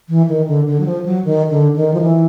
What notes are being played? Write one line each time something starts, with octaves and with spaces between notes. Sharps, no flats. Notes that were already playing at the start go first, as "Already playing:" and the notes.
E3
D#3
D3
D3
F#3
F3
F#3
D#3
D3
D#3
F3
E3